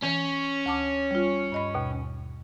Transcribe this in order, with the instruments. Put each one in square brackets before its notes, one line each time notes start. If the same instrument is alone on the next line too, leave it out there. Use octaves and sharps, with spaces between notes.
[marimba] E3 [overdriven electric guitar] C#4
[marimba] D2 A5 D6
G3 F4
G2 D#5 B5
D#2 B2